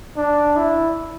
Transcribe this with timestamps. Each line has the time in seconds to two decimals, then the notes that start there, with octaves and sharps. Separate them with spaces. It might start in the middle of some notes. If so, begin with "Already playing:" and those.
0.17 D4
0.57 E4